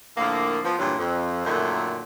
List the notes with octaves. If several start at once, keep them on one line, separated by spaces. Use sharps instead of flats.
A2 D3 F3 A#3
F3 B3
G2 A#2 C#3 E3 F#3
F2
F#2 A#2 D3 D#3 A3